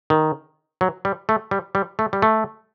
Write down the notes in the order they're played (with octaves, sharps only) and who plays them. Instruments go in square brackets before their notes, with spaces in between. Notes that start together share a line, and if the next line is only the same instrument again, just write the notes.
[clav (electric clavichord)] D#3
F#3
G3
A3
G3
G3
A3
G3
A3